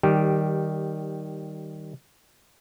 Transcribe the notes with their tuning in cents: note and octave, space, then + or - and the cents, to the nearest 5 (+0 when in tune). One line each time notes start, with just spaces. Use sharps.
D#3 +0 G3 -15 G4 +0